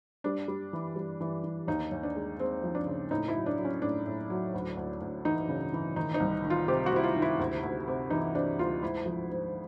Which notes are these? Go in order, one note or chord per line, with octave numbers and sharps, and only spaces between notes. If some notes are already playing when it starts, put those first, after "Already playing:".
G3 D4
G3
E3
G3
E3
E3
D#2 D#4
D#2
D4
G#3
G#3 C4
F3
D4
C#3
A2 D#4
E4
F#3
D4
F#3
C#4
A2 D4
A2
F#3
D2
D2
D2
E3 D#4
C#3
E3
D#3 D#4
D#4
C2
D#3
F4
C3 G4
F#4
C3 E4
F4
D#3
E4
D2
D2
C3
E3 D#4
C3 D4
D2 F4
G#2 E4
F3
G#2